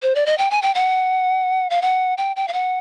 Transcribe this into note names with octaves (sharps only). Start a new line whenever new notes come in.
C5
D5
D#5
G5
G#5
G5
F#5
F5
F#5
G5
G5
F5
F#5